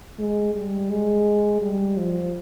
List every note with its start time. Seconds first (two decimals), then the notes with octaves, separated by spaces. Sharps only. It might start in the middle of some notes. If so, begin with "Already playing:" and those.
0.19 G#3
0.55 G3
0.91 G#3
1.61 G3
1.97 F3